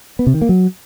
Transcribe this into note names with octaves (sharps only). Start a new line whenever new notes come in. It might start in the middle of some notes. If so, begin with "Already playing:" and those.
B3
C3
D#3
A#3
F#3